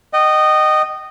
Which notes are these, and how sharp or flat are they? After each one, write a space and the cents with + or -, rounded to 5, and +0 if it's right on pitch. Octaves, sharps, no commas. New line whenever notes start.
D#5 -15 G5 -40